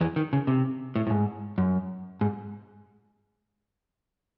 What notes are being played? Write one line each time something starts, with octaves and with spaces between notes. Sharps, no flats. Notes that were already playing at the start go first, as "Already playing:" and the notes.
E2 E3
D#3
C#3
C3
A2
A2
G#2
F#2
G#2